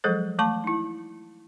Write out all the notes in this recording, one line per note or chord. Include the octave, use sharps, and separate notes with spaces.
F3 F#3 G#3 G#4 A4 C5
E3 A3 A5 C#6
D#4 E4